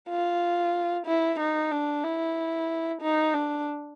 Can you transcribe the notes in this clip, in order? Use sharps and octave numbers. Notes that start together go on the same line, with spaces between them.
F4
E4
D#4
D4
E4
D#4
D4